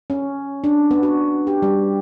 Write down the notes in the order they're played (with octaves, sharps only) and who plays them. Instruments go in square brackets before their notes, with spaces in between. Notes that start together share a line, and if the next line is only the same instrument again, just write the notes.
[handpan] C#4
D4
B3
F#4
G4
G3